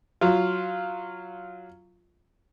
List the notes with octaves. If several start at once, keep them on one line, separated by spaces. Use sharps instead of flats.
F#3 F4